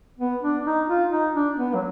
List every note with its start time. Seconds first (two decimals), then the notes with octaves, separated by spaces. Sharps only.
0.19 B3
0.42 D4
0.65 D#4
0.88 F4
1.11 D#4
1.34 D4
1.57 B3
1.75 F#3